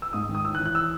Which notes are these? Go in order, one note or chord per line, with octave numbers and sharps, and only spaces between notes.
E6
G#2 D#6
D#3
D#6
A2 E6
F#6
E3
F#6
E6